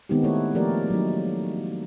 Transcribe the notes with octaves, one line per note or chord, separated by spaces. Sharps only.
D#3 G#3 B3 C4 D#4 G4
D#3 A3 E4 A4 C#5
F3 A3 A#3 G4 A#4 D5
F#3 A#3 D#4